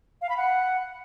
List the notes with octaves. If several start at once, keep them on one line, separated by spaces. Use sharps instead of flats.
F5
B5
F#5